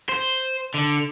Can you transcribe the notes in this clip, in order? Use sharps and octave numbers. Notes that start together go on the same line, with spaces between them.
C5
D3